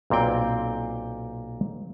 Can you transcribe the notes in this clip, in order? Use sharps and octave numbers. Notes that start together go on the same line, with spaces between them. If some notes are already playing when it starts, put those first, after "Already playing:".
B1 A#2 C4 G5